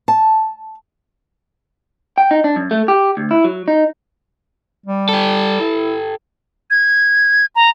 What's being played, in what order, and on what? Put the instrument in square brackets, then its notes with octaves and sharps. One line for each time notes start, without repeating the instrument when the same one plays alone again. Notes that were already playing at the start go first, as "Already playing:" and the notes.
[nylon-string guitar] A5
[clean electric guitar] G5
D#4
D4
F#2
A3
G4
D2
E4
F#3
D#4
[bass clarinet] G3
[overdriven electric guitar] G4 A4
[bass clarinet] E4
[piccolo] G#6
A#5